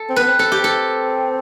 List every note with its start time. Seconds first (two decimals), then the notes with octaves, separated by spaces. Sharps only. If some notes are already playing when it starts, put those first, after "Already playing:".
Already playing: A4
0.09 C4
0.16 B3 B4
0.27 C4
0.39 C4 A4
0.52 G4
0.64 A4